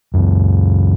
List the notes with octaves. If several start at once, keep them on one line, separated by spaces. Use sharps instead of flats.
C#2 F#2